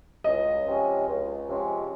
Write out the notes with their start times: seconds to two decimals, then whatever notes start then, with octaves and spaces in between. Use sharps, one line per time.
0.24 C#2 D#5
0.65 C3 F3 G#3 C#4
1.07 C#2
1.47 C3 F3 G#3 C#4